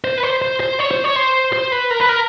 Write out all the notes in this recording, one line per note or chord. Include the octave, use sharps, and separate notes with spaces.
C5
B4
C5
C5
C5
C#5
C5
C#5
C5
C5
B4
A#4
B4
A#4